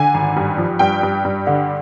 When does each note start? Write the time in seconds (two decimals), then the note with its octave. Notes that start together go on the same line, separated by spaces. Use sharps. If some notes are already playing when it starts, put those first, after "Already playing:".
Already playing: D3 G#5
0.14 G#1
0.36 G2
0.58 F3
0.79 G2 G5
1.03 G2
1.25 G2
1.47 D3